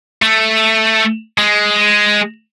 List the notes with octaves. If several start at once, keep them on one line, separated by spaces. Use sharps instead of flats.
A3
G#3